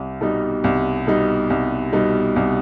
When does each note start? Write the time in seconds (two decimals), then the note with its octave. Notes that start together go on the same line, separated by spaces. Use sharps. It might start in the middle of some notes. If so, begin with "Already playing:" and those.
Already playing: C2
0.21 B2 G3 D#4
0.64 C2
1.07 B2 G3 D#4
1.50 C2
1.93 B2 G3 D#4
2.36 C2